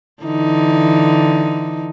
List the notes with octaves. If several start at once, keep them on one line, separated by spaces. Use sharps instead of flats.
D3 E3 D#4